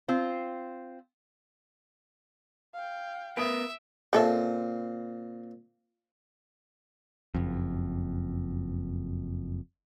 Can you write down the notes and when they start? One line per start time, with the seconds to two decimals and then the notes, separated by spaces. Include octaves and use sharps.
0.08 C4 F4
2.74 F5 G5
3.37 B3 A#4 B4 E5 D#6 D7
4.13 A#2 C#3 C4 A4 E5
7.35 F#1 F2